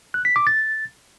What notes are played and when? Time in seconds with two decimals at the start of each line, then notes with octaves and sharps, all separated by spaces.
0.14 F#6
0.25 B6
0.36 D6
0.47 A6